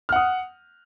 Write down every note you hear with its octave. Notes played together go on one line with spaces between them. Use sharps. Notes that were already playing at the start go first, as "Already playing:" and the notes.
F#5 D#6 F6